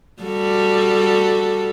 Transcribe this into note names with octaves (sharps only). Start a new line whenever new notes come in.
G3 F#4 A4